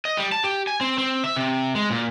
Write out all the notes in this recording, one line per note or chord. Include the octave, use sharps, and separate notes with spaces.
D#5
G3
A5
G4
G#5
C4
C4
E5
C3
G#3
A#2